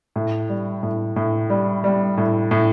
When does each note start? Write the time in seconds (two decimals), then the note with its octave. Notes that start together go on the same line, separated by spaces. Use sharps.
0.16 A2
0.49 G3
0.83 A2
1.16 A2
1.50 G3
1.84 G3
2.18 A2
2.51 A2